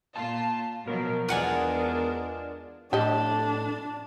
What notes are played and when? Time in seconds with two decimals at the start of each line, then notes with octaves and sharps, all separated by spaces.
0.16 A#2 F4 A5
0.87 B2 F3 F#3 A#4
1.29 E2 G#3 D4 F4 F#5 G#5
2.93 A2 D4 G4 D#5